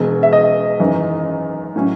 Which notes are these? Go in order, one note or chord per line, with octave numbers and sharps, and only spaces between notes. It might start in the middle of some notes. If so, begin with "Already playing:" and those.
Already playing: E1 E2 B2
E5
D#5
G#1 F#2 E3
A2 F#3 C#4